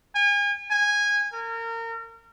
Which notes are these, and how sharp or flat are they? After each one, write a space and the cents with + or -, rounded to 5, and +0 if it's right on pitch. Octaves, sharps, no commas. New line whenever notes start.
G#5 -35
G#5 -15
A#4 -30